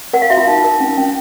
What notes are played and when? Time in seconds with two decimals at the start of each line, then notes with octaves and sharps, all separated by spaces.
0.13 A#4 F#5
0.22 F5
0.30 F#4 E5
0.37 F4 F5
0.48 D#4
0.64 A#4
0.80 C#4
0.98 C#4